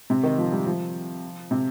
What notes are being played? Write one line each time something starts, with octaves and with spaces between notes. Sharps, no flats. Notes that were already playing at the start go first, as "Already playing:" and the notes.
C3
D#3
F3
G3
F3
C3